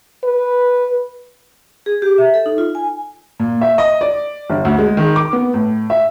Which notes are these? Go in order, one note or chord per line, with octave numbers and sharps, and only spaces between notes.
B4
G#4
G4
E5
A4
D#4
F4
G#5
A#2
E5
D#5
D5
G1
D2
G#3
D#3
D6
B3
A2
E5